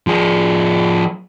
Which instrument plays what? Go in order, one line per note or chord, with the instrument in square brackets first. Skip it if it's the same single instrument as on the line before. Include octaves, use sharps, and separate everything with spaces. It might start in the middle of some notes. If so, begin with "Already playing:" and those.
[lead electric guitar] F3 G#4